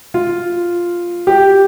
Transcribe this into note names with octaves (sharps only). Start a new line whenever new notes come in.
F4
G4